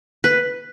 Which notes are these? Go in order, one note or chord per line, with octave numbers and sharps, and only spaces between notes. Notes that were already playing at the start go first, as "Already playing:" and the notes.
B4